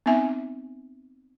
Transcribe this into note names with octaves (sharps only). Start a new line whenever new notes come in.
B3 C4 D#4 E5 G#5